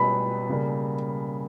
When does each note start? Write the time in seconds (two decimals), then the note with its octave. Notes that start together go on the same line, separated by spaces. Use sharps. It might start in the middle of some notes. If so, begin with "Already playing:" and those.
Already playing: B2 G3 B3 G4 B5
0.49 C#3 G3 A#3